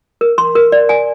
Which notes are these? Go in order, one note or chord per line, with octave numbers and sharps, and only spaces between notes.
A#4
C6
A#4
D5
G#5